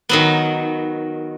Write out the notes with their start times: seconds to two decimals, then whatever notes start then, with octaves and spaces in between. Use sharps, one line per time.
0.09 D#3 F#3 B3